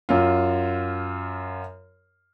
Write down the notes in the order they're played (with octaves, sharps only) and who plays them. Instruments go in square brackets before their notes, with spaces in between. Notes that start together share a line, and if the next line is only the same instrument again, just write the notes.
[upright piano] F#2 F4